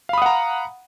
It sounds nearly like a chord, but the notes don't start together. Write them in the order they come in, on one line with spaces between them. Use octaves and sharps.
F5 B5 D#6 F#5 A#5